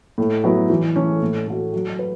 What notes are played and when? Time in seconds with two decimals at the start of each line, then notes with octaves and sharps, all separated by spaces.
0.18 A2
0.44 F#3 B3 E4
0.70 E3
0.96 A3 C#4 A4
1.22 A2
1.47 A3 F#4
1.73 F#3
1.99 B4